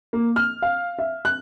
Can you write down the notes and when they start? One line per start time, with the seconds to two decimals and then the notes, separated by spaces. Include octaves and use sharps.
0.13 A#3
0.36 F6
0.62 F5
0.99 E5
1.25 F#6